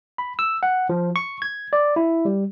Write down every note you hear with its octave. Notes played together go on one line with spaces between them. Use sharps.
B5
E6
F#5
F3
C#6
G#6
D5
E4
G3